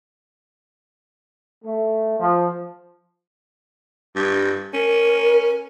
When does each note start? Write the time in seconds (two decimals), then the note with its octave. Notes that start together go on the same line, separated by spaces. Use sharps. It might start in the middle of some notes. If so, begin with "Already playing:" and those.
1.65 A3
2.20 F3
4.16 G2
4.74 C#4 A#4